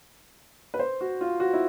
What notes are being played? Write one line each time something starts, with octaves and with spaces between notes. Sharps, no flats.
B4
C5
F#4
F4
F#4
E4